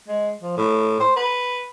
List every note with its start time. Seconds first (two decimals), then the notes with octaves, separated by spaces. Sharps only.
0.08 G#3
0.42 F3
0.57 A2
1.00 C5
1.17 B4